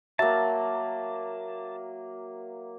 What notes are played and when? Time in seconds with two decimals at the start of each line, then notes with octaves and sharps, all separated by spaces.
0.19 F#3 A#3 E5 A5